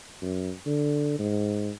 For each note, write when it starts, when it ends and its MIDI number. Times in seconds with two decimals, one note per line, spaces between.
0.22 0.52 42
0.66 1.18 50
1.19 1.71 44